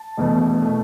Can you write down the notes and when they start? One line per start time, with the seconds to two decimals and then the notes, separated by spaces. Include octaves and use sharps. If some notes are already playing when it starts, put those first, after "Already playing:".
Already playing: A5
0.18 E1 E2 B2 A3
0.62 B2 A3